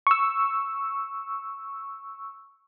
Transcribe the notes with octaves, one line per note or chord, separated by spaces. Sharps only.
C#6 E6